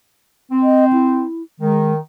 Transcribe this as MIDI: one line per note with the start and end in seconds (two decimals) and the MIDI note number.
0.51 1.22 60
0.63 0.85 75
0.93 1.43 64
1.60 1.97 51
1.60 1.93 56